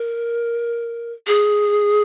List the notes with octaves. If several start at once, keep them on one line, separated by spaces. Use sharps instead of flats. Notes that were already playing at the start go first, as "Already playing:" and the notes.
Already playing: A#4
G#4